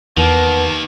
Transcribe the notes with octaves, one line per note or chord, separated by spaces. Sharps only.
E2 D#3 A#3 B3 A5